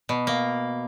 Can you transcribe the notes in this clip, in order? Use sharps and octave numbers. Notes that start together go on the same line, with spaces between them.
B2
A#3